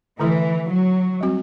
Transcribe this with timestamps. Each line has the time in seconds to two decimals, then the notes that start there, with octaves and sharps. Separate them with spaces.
0.20 D3 E3 A3 E4 A4
0.71 F#3
1.21 G3 C4 F#4